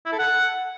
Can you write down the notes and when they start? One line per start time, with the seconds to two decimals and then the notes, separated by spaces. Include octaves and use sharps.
0.06 E4
0.12 A4
0.19 F#5